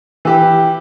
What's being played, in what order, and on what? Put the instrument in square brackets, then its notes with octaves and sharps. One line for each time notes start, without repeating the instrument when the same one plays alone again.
[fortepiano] E3 G4